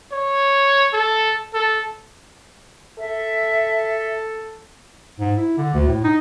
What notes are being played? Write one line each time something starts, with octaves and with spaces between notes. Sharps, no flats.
C#5
A4
A4
A4 E5
G#2
E4
D3
D2
A2
D#4